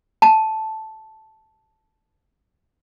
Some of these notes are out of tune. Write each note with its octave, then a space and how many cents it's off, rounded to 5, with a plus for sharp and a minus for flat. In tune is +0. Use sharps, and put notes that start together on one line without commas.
A5 -5